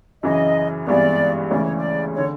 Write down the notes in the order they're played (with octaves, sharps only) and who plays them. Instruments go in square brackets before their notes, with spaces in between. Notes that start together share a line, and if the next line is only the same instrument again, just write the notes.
[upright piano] F#2 C#3 E3 [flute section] D#5
[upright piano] G#1 G2 E3 G#3 B3 [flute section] D5
[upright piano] D2 C#3 E3 G#3 C#4 [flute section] D5
[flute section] C#5
D5
[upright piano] D3 [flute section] C#5